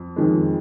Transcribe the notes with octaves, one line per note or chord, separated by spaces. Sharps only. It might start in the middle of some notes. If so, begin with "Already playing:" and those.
Already playing: F2
F2 D#3 G#3